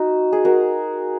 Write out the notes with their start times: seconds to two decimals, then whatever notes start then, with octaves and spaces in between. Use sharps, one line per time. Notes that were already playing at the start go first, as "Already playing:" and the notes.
Already playing: D#4 F#4
0.33 G#4
0.45 F#4 A#4